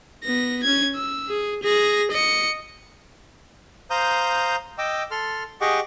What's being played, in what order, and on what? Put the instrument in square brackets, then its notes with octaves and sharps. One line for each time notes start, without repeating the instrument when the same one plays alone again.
[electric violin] B3 A#6
C#4 G#6
E6
G#4
G#4 A#6
D#5 C#7
[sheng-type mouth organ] C5 F5 A#5 D#6 G6
D#5 G5 D6 E6
A4 C6 F6
G4 G#4 D#5 F#5 C#6 D6